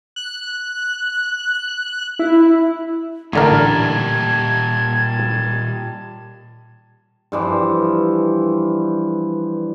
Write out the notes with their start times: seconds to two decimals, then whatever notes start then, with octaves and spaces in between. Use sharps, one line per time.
0.16 F#6
2.19 E4
3.33 A1 A#2 D3 G3 A#4 A5 G#6
7.32 G2 E3 F3